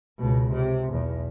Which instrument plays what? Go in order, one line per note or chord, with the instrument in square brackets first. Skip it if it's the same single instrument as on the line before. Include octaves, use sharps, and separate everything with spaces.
[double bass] C#2 B2
C3
B1 E2